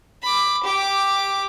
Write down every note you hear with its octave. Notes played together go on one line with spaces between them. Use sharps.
B5 D6
G4 D6